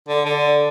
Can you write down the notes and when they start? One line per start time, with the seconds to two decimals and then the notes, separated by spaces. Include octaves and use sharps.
0.08 D3
0.25 D3